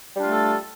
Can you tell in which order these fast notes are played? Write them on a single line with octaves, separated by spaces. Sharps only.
G3 D4 F4 A3 A4